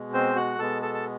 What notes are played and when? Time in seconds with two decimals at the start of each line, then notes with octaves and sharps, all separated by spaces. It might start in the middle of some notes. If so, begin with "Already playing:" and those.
Already playing: B2 G#3
0.13 C4 C5
0.36 F#4 F#5
0.58 B2 G#3 B3 A4 A5
0.82 A4 A5
0.94 A5